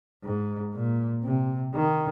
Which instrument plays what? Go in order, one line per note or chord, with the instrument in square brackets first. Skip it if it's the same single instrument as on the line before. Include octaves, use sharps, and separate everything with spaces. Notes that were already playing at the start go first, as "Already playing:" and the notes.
[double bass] G#2
A#2
C3
D#3